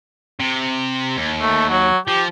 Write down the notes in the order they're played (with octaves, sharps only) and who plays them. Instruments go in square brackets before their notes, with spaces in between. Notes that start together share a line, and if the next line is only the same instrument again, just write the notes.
[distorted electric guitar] C3
D#2
[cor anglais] A3
F#3
[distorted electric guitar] F3 [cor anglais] G4